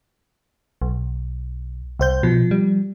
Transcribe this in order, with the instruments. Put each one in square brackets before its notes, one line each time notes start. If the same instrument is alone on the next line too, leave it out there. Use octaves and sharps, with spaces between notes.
[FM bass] B1
[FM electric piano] C2 C5 G6
[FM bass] B2 [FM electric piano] F3
[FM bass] G3